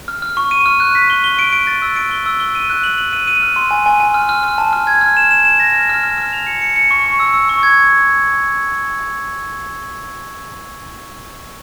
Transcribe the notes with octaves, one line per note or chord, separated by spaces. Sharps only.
F6
F6
C#6
D#7
F6
F#6
B6
G7
G7
D7
D7
A6
E6
D7
G7
E6
G7
D#7
F#6
F#7
F#7
D#7
D#7
F6
C6
G#5
G#5
G#5
F6
F6
F6
A5
F6
G#6
F6
E7
E7
E7
A#6
F6
F6
F6
F6
F7
C#7
C#7
C#7
C#6
C#6
E6
E6
C#6
G#6